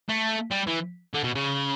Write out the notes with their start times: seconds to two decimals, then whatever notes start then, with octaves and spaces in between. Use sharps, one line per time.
0.09 A3
0.51 G3
0.67 E3
1.14 D3
1.23 B2
1.35 C#3